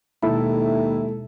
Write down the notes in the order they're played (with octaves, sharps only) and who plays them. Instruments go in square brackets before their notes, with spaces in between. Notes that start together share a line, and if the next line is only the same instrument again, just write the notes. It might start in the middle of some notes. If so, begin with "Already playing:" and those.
[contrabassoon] D#2 [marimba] B2 B5 [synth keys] G#3 A4 [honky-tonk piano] E4